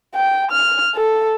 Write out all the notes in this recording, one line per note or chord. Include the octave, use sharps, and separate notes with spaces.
G5
F6
A4